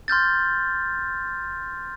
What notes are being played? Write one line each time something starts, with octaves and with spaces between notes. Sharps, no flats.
C6 F6 G6 A6